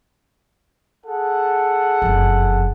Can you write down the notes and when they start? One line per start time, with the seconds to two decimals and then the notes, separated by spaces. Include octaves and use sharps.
1.06 G#4 A4 F#5
2.02 F#1 F2